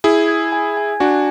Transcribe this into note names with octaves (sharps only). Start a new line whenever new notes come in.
E4 G#4 G#6
G#6
G#5
G#5
D4 F#4 G#5